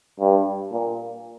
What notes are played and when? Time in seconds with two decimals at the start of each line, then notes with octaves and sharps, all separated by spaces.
0.20 G2
0.72 A#2